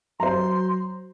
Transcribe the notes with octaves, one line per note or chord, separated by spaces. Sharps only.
F#3 C5 A#5 C6